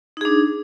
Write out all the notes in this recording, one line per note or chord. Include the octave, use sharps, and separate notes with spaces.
D4 D#4 G#4